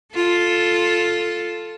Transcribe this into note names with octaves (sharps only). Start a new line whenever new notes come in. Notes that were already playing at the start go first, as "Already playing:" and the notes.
F4 A4